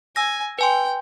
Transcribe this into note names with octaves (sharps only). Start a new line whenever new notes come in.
G#5 E6 A#6
B4 G5 G#5 C6